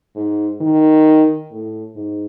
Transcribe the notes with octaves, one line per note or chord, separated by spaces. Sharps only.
G#2
D#3
A2
G#2